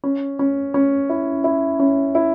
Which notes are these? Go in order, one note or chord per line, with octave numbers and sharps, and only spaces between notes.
C#4
C#4
C#4
E4
E4
C#4
E4